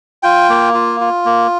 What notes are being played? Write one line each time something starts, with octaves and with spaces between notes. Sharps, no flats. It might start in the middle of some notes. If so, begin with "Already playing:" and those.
F4 G5
A#3
F4
F4
A#3